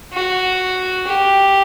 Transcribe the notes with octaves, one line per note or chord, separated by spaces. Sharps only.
F#4
G4